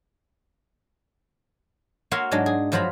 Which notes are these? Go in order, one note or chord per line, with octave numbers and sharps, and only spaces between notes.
A#3 F#4 C#5 E5 F5 C6
G#2 F#3 G#3 D4
G#4
G2 F3 F#3 C5 A#5 B5